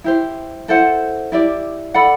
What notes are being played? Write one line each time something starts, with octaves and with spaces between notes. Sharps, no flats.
E4 G4 C5
E4 A4 C5 F#5
E4 G4 D5
A4 D5 F#5 B5